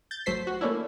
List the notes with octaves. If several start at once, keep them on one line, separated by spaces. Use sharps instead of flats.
G6 A6
G#1 F#3 A3 C5 B6 C7
F#4
A3 A#3 C#4 D4 E4